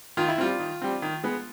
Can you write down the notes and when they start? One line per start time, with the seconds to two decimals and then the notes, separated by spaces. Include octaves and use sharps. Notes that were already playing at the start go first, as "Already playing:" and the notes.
0.17 D#3 F4
0.28 E4
0.38 G3 C4 F4
0.59 D#3
0.82 G3 C4
1.02 D#3
1.23 G#3 B3